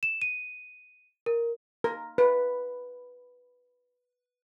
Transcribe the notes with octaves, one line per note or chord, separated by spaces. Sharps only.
E7
D#7
A#4
A#4
B4